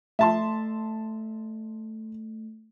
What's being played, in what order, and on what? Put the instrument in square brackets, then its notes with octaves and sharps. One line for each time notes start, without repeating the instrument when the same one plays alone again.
[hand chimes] A3 [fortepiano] E5 A5 C6